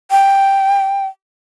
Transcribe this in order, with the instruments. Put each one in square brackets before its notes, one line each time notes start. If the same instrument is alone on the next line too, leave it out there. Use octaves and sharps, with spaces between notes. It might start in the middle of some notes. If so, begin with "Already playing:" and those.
[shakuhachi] G5